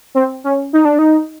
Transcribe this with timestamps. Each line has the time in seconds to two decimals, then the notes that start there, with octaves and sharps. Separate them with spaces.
0.15 C4
0.44 C#4
0.73 D#4
0.85 D4
0.99 D#4